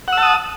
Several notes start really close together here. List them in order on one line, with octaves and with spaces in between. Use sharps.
F#5 E6 A5 D#6